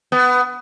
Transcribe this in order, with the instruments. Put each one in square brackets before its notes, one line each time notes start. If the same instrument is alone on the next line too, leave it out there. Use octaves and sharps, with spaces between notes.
[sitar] B3